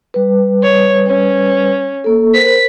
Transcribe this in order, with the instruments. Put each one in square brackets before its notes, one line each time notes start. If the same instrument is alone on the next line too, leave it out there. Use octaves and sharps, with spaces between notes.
[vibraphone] G3 B4
[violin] C#5
C#4
[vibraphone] A#3 A4
[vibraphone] A#4 C5 [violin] B6